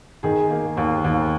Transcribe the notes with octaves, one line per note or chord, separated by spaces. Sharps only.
D#3 G#4
A#3
D#2
D#2